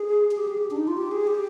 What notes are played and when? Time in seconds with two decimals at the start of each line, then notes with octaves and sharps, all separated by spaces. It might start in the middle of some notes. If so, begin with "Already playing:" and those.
Already playing: G#4
0.31 G#4
0.38 G4
0.47 G#4
0.58 G4
0.71 D4
0.77 D#4
0.88 F4
0.97 G4
1.12 G#4
1.27 G4